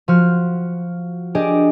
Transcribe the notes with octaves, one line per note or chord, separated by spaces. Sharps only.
F3 F#4 F6
D4 G4 G#4 D5 D#5